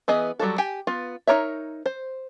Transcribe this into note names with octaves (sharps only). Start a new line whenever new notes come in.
E3 B3 G#4 D#5
F#3 G3 F#4 A4
G4 G5 G#5
B3 F4
D#4 F#4 A#4 C#5 E5
C5